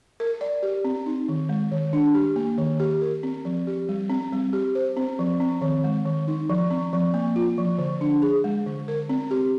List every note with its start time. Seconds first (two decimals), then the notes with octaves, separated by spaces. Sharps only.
0.20 A#4
0.41 D5
0.63 G4
0.84 C4
1.06 D#4
1.29 D#3
1.49 G#3
1.71 D#3
1.93 D4
2.14 G4
2.36 A#3
2.58 D#3
2.80 G4
3.01 A#4
3.23 C4
3.45 F3
3.67 G4
3.89 G3
4.10 C4
4.32 G3
4.53 G4
4.75 C5
4.97 C4
5.19 F3
5.40 C4
5.62 D#3
5.84 G#3
6.05 D#3
6.28 D#4
6.49 F3
6.71 C4
6.93 F3
7.14 A#3
7.36 F4
7.58 F3
7.79 D3
8.01 D4
8.22 G#4
8.44 G#3
8.66 D3
8.88 A#4
9.09 C4
9.31 G4